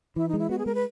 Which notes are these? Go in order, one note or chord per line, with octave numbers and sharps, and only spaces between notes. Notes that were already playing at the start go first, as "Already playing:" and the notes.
E3 E4
G#3 D#4
E4
B3 F#4
G#4
G#3 A#4
B4